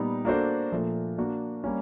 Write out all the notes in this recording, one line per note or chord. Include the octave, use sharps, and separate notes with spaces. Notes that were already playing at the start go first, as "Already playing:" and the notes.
Already playing: A#2 G3 B3 D#4 G4
A#3 D4 F#4 A4 C5
A#2 F3 A3
A#3 D4 F#4
G3 A#3 C#4